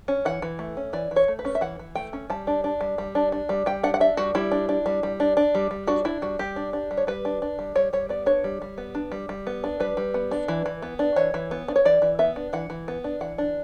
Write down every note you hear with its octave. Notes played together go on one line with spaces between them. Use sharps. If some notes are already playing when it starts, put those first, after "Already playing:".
C#4
E3 F#5
E3
A3
C#4
E3 D5
E3
C#5
A3
B4
C#4
E5
E3 F#5
E3
A3 G5
C#4
G3 A5
D4
D4
G3
G3
D4
D4
G3
G3 G5
D4 F#5
F#5
D4 E5
G3 F#4
G3 E4
D4
D4
G3
G3
D4
D4
G3
G3
D4 F#4
D4 E4
G3 F#4
G3 G4
D4
D4
G3
C#5
G3 B4
D4
D4
G3
G3 C#5
G3 C#5
B3 D5
D4 C#5
G3
G3
B3
D4
G3
G3
B3
D4
G3 B4
G3
B3
D4
E3
E3
B3
D4
E3 C#5
E3
B3
D4
C#5
E3 D5
E3
B3 E5
D4
E3 F#5
E3
B3
D4
E3 F#5
D4